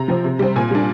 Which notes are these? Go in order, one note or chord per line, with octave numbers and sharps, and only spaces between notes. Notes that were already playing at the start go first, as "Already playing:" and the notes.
Already playing: C3 A#5
F3 C4
C3
G3 C4
A#2 G#5
G3 D4